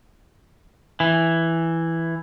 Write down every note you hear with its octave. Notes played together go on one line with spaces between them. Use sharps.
E3